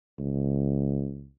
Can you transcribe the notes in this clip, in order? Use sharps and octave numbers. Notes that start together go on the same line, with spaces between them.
C#2